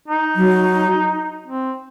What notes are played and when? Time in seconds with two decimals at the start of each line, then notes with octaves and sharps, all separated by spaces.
0.08 D#4
0.36 F#3
1.46 C4